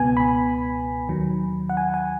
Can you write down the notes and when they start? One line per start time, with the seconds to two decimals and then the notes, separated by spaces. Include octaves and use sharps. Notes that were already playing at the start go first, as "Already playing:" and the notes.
Already playing: C#2 B2 B3 G#5
0.17 B5
1.08 D#2 D#3 F#3
1.69 F#5
1.77 G#5
1.94 G#5